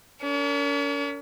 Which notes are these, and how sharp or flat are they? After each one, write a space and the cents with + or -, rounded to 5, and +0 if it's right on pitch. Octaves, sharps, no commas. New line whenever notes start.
C#4 +45 A#4 -25